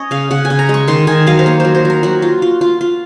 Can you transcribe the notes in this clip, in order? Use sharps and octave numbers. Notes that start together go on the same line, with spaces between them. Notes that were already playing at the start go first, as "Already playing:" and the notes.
Already playing: C#4 C#5 D#5
C#3 F5
C#3 F#5
G#5
C#3
A#5
G#3
C#6
D#3 C6
D#3 G#5
F#3 F5
C5
A#3 C#5
F#3 C5
C5
F#3 A#4
F#3 F#4
F4
F4
F4
F4